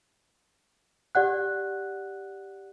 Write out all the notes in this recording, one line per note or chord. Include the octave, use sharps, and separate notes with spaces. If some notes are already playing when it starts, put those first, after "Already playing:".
G4 D5 F#5 F#6